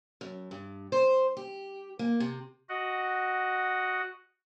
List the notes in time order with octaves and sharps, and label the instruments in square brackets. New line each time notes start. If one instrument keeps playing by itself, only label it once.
[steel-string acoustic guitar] F#2
G2
C5
G4
A#3
C3
[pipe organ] F#4 D#5 F#5